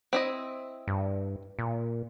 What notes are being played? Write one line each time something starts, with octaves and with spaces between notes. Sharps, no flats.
C4 E4 D#5
G2
A#2